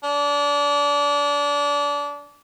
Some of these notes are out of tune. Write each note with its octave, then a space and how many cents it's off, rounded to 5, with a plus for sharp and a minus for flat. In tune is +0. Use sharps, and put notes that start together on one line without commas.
D4 -25